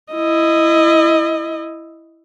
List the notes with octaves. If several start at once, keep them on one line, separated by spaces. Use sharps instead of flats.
E4 D#5